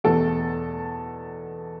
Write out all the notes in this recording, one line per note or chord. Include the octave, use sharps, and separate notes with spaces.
E2 B2 A4